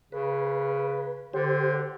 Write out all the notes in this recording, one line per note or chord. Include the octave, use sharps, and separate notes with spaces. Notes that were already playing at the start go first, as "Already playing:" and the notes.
C#3 B4
D3 G4 C5